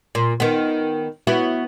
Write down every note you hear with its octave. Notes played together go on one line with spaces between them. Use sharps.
A#2
D#3 B3
B3 E4 F#4